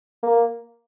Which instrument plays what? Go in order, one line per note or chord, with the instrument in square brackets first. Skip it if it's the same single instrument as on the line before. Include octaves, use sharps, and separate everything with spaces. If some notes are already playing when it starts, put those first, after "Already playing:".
[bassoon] A#3